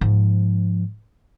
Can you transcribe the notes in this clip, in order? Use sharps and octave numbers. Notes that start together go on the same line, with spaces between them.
G#2 F3